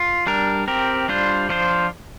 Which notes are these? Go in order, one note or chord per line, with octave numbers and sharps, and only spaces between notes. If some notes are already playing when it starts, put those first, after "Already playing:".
Already playing: F4
G3 D4 A#4
C4 G4 A#4
G3 D4 F4 C5
F3 D4 F4 C5